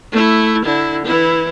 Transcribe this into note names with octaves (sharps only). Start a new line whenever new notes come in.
A3 E4
D3 E4
E3 E4